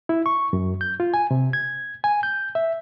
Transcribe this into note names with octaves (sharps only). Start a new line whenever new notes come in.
E4
C#6
F#2
G6
F4
G#5
C3
G#6
G#5
G6
E5